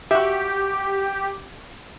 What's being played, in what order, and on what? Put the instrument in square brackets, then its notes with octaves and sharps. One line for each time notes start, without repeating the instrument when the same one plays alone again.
[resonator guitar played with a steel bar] F#4 E5 [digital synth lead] G4